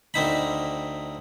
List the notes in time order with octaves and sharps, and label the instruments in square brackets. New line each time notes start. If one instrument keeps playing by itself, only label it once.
[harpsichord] D2 C4 D#4 B5